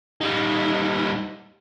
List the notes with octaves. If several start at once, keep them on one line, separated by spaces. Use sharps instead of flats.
G3 D#4